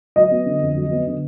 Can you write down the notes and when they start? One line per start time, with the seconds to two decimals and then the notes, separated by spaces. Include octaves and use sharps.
0.16 F#3 D#5
0.31 B3
0.46 D3
0.61 F2
0.76 F#3
0.91 B3
1.07 D3